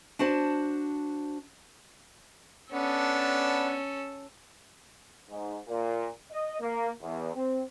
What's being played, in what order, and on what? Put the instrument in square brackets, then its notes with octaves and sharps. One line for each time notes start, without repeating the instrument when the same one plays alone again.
[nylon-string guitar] D4 F#4 C5 A5
[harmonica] B3 D4 [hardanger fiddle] C#4 A4
[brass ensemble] G#2
A#2
D#5
A#3
E2
C4